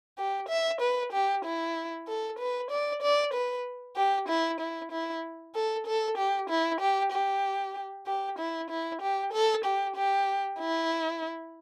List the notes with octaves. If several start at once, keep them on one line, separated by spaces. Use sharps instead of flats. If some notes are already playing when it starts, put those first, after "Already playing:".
G4
E5
B4
G4
E4
A4
B4
D5
D5
B4
G4
E4
E4
E4
A4
A4
G4
E4
G4
G4
G4
E4
E4
G4
A4
G4
G4
E4